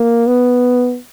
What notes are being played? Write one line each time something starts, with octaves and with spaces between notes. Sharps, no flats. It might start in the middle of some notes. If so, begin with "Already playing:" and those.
Already playing: A#3
B3